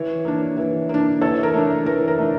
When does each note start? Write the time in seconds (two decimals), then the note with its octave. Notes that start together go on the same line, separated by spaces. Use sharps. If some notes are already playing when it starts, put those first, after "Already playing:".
Already playing: E3 C#5
0.25 A#3 D4
0.57 E3
0.89 A#3 D4
1.21 E3 A4 C#5
1.43 A#4
1.54 A3 D4
1.86 E3 A#4
2.08 A#4
2.19 A3 D4